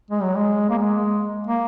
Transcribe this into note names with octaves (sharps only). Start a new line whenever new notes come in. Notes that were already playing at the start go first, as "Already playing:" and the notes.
G#3
F#3
G#3
A#3
G#3
A#3